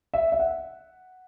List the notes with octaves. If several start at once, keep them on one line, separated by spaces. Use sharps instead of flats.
E5
E5
F#5